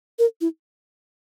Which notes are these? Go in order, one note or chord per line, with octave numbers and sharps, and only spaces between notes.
A#4
E4